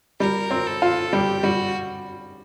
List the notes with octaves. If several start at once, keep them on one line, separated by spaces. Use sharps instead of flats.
G3 A#4
C4
A4
F4
G3 G4
G3 F#4